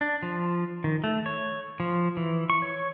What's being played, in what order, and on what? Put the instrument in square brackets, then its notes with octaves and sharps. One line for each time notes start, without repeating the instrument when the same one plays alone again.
[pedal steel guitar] D4
F3
D#3
A3
C#5
F3
E3
C#6
C#5